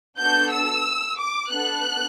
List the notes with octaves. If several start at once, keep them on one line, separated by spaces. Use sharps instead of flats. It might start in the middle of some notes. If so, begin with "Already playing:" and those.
B3 D4 F#4 A4 G6
E6
D6
B3 D4 A4 F#6